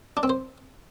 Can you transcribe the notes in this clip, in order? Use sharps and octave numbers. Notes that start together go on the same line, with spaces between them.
D4
C4
C5